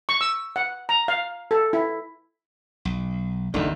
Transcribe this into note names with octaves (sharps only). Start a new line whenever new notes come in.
C#6
E6
F#5
A#5
F5
A4
E4
B1
A1 E2 D3 D#3 A3